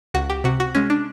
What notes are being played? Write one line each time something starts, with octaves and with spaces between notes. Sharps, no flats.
C#2 F#4
G4
C3 F#4
F#4
G#3 C#4
D4